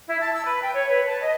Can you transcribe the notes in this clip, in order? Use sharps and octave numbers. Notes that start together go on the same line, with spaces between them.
E4
A5
E6
B4
G5
C#5
B4
A5
D#5